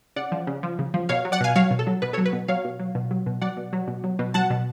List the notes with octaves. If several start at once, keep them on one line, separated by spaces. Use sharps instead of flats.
C#3 D5 F#5
F3
C#3
F3
C#3
F3
B2 C#5 F5
F#3
D5 F#5
B2 F5 G#5
F#3 C#5 F5
B2
A4
F#3
B2 B4
A4 C#5
F#3
B4
B2
F#3 C#5 F5
B2
F#3
B2
F#3
B2
F#3 D5 F#5
B2
F#3
B2
F#3
B2
F#3 F#5 A5
B2